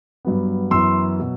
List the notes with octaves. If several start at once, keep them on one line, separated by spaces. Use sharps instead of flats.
G2 F#3 B3
F#2 E3 B3 C6 E6
B2 F#3